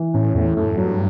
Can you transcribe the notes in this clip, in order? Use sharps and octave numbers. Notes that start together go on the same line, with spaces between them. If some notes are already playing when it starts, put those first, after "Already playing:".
Already playing: E3
A2 C#4
E2 A2
F#2 A3
G2 F#3